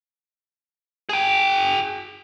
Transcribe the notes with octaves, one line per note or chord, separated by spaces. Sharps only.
G#4 G5